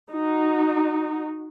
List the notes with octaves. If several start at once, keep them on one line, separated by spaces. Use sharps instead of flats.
D#4 F#4